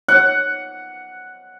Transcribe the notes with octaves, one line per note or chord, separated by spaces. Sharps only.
F#5